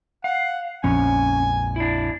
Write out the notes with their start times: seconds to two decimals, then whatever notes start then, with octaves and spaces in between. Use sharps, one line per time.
0.24 F5 F#5
0.84 A#1 F2 C#4 G#5
1.76 D4 E4